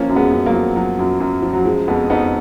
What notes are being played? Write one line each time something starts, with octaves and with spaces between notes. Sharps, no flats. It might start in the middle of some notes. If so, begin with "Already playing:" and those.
Already playing: F3 A#3 C#4
F#2
G#3 B3
F#2
F#3 A#3
F3
F3 F#3
F#2
F#2
F3
F#3
F3 G#3
F2 G#3 B3
F2 B3 D#4